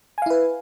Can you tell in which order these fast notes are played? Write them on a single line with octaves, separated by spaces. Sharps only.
G#5 F5 E4 B4